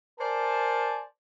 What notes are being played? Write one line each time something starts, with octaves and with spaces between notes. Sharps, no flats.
A#4 C5 D5 G#5 A5